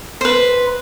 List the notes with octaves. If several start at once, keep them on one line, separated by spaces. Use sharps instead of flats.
B4 C5